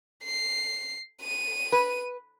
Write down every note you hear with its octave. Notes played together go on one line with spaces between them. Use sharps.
C7
D#7
B4